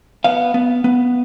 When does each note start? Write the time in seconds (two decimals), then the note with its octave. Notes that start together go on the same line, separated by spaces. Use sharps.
0.24 B3 F5
0.54 B3
0.84 B3